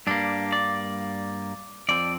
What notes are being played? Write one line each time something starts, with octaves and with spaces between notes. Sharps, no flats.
G2 G3 A#3 D4
D5
F2 F3 C4 D5